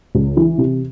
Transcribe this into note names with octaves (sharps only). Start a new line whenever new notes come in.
C#2
E3
C3